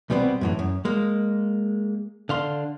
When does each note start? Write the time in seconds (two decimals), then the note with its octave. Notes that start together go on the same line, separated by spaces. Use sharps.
0.10 C2 B2 G3 A3 B3 C4
0.41 F#2 A2 E3
0.59 F#2
0.85 G#3 A#3
2.29 D3 F5 C6